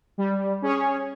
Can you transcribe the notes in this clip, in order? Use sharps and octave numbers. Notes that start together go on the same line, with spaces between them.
G3
C#4 G#4 C#5